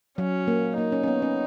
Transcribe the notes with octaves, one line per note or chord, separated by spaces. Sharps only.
F#3 C#4
A#3
A#3 D#4
C#4
C#4
B3
C#4